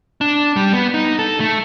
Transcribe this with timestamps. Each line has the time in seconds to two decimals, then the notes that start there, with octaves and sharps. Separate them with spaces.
0.21 D4
0.56 G3
0.73 B3
0.94 D#4
1.19 A4
1.40 A3